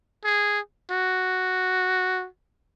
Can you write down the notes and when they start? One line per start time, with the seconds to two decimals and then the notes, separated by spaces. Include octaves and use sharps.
0.25 G#4
0.91 F#4